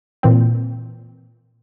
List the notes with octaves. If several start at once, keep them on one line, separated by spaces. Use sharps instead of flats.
A#2 E3 C4